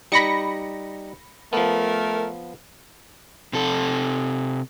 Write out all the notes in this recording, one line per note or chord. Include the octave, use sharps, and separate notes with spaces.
G3 D#4 B5 A#6 C#7
F3 A3 B3 A#4
C3 A4